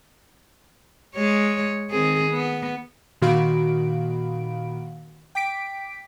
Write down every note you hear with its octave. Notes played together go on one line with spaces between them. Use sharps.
G#3 C#5
D#3 C4 G#4
B3
A#2 D#3 F#4 F5 B5 D7
G5 D6 B6 D7